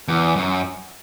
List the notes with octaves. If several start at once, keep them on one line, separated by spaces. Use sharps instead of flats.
E2
F#2